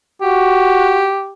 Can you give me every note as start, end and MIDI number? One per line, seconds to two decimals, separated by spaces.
0.22 1.10 66
0.22 1.33 67